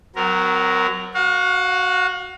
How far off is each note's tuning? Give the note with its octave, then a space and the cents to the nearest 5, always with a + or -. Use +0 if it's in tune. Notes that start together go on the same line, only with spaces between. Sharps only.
F#3 +0 C4 -45 A#4 +0
F#4 +0 F5 +35